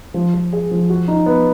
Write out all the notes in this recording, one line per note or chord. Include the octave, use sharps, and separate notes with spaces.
F3
F3
G#4
F3
F#4
D#4
B3